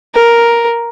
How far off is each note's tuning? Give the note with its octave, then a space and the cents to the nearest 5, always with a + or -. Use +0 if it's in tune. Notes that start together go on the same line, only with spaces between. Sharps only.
A#4 +5